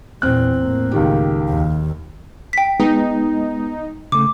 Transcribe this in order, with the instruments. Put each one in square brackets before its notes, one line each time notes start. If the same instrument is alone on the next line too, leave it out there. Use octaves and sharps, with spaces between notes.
[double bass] E2 A#2 [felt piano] C4 F#6
[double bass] A2 A#3
[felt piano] C#2 D#3 G4
[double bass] D#2
[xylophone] G5 B6
[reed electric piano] G#3 B3 [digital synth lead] D#4
[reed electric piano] C#3 A3 [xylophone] D6